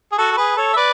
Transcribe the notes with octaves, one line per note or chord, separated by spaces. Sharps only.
G#4
F#4 A4
A4
G#4 B4
A4 C#5
E5
B4 D5